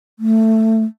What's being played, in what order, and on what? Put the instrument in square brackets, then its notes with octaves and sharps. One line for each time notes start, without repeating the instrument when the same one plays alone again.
[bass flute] A3